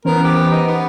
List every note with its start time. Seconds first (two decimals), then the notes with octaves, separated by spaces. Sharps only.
0.05 E3 B3 C#4 A#4 C5
0.24 G4
0.51 D#4
0.67 B3